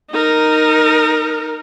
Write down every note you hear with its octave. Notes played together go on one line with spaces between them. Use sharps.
D#4 A#4